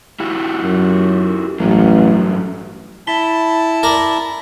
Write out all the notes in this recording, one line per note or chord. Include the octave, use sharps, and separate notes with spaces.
E4 F#4 G4
F#2
A1 G2 F#3
E4 A5 B5 B6 G7
A#4 D5